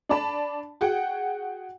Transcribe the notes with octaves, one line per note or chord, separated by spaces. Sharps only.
D4 D5 A5 B5
F#4 G#4 F#5 G5